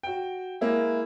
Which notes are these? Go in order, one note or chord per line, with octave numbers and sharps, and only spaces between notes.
F#4 G5
G#3 A#3 E4